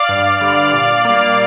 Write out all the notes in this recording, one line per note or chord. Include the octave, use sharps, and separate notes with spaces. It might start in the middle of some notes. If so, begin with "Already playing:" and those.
Already playing: D5 F5
G2
D3 G3
A#2
G3 A#3